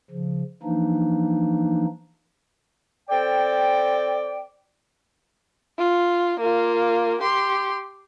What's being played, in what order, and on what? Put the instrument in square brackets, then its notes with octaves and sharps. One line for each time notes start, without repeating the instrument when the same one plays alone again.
[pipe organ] C#3 F3
E3 F3 A#3 D4 D#4
[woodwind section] C4 A4 G5 [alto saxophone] D5
[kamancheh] F4
A#3 F4
G4 C6